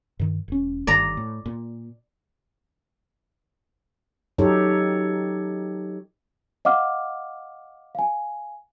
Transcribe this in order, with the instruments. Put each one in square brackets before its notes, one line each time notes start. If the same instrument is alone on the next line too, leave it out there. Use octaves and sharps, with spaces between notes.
[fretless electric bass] G2 D#3
E1 C#4
[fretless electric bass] G1 G2 D#3 [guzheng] D5 A#5
[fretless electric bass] A2
A#2
[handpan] F#3 D#4 G4 A4 C#5
[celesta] D#5 F5 F#5 D6 F6
F5 G#5